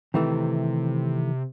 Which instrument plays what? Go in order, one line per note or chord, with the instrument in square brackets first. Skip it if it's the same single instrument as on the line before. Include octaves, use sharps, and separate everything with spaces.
[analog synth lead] C3 [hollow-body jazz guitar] D#3 E3 A3